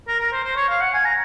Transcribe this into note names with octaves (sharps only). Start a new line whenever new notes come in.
A#4
A#4
C5
C5
C#5
F5
F#5
G#5
A#5